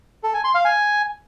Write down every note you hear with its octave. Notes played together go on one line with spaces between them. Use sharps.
A4
G#5
C6
F5
G#5